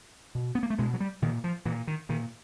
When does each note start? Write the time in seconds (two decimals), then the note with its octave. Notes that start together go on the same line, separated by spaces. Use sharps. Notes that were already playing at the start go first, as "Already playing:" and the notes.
0.35 B2
0.55 B3
0.63 A#3
0.70 A3
0.78 B2 G#3
0.93 F#3
1.00 G3
1.22 A#2 D#3
1.44 F3
1.65 A#2 E3
1.87 D#3
2.09 A#2 D#3